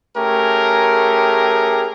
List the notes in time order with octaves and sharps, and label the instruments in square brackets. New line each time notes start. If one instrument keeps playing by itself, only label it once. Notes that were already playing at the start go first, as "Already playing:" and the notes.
[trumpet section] A3 C#4 G4 G#4 A#4